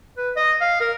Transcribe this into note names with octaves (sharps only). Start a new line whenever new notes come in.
B4
D#5
F5
A#4